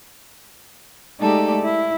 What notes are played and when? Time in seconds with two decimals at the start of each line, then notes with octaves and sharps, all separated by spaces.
1.19 G#3 A3 D#4 G4 A4 D5
1.61 E4